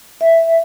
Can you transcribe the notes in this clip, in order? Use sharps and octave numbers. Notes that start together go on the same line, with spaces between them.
E5